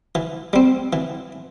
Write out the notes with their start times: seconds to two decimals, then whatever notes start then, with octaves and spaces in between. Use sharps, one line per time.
0.15 E3
0.53 G3 C4
0.93 E3